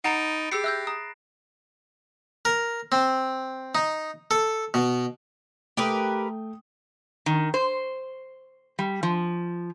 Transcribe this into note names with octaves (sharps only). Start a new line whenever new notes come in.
D#4 F#5 A#5 B5 A6 C#7 D7
G4 G#4 E6 C7 C#7
E5 E6 F#6 G6 A#6
A#5 D#6
A#4
C4
D#4
A4
B2
A3 G4 A#4 B4 G5 D#6
D#3
C5
G3
F3